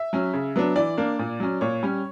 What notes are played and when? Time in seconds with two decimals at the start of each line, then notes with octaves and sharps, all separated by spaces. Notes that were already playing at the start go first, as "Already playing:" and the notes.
Already playing: E5
0.13 F#3 C#4
0.33 C#3
0.56 F#3 B3 D4
0.76 E3 D5
0.98 A#3 D4
1.19 A#2
1.40 F#3 C#4
1.61 A#2 C#5
1.83 G3 C#4